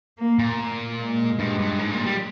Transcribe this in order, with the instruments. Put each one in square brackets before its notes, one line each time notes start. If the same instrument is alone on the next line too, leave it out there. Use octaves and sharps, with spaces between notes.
[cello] A#3
[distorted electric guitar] A#2
[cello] A#3
G#3
[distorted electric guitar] G2
G2
G#2
A#2
G3